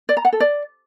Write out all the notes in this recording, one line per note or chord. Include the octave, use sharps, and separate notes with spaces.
D5
A#5
F#5
A4
D5